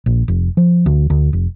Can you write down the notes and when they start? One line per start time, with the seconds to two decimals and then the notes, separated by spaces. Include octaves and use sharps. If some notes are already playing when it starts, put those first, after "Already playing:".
0.06 A#1
0.28 F1
0.57 F3
0.86 D2
1.10 D2
1.33 F1